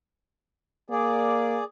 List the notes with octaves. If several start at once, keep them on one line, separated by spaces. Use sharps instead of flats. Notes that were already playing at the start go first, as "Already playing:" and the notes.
A#3 G#4 D5